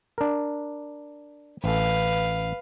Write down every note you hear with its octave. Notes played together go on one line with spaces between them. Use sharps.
D4 A#4
A1 A4 B4 F5